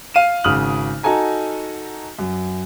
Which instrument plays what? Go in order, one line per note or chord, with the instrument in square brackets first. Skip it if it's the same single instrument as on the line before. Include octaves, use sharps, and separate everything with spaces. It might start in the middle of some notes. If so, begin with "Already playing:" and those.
[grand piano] F5 D#7 E7
G#1 C#3 D#6 F6 F#7
D#4 F#4 A4 G#5 A#5
F#2